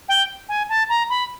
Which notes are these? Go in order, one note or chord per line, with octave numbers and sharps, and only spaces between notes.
G5
G#5
A5
A#5
B5